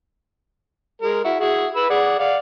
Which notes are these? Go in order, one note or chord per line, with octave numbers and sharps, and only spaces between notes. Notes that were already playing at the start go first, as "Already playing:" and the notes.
G#3 A#4
E4 F#4
E4 F#4 G#4
B4 B5 E6
G#4 D5 F#5
D5 F5 F#5